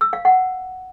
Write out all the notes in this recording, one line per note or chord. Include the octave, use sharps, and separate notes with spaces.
E6
F5
F#5